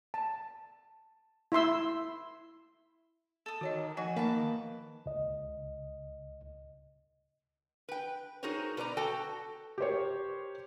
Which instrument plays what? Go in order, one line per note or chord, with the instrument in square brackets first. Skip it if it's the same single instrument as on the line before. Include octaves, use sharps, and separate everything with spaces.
[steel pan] A5
E4 E5 C6 E6
[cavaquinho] A4 D#6
[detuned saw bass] D#3 [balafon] F#4 C#5 D#5
[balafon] F3 D#5 [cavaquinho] F#4 G#5
[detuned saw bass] D#3 [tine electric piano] A#3 [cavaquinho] B4 A5 D6
[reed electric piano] C#2 D#5
[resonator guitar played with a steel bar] B4 G5
D#4 F#4 G#4 A#4 C5 C#5
B2 B4 D5 A#5
F#4 A4 G5 A5
[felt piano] G4 A#4 C5 C#5